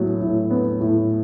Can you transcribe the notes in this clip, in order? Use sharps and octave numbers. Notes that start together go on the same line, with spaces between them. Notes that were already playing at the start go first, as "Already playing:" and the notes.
Already playing: A2 F#3 B3
A2
B3
A2